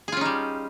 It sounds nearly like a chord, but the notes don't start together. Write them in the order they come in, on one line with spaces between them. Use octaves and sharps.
G#4 F4 C#4 D#4 G3